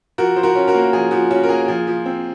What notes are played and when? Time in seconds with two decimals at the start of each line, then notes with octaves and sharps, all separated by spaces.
0.18 F3 F#4 A#4
0.36 F3 C5
0.43 F#4 A#4
0.55 C#4
0.67 F#4 A#4
0.75 A#3
0.93 F3 G#4
1.11 F3 F#4
1.30 C#4 F#4
1.43 A#4
1.49 A#3 G#4
1.68 F3 G#4
1.87 F3
2.06 C4